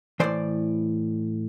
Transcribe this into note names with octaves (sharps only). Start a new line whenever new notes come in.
A2 E3 C5 D5